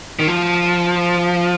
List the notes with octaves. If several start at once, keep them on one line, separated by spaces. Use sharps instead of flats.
D#3
F3